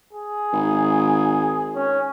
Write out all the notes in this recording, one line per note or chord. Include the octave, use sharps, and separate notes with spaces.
G#4
G#1
C#4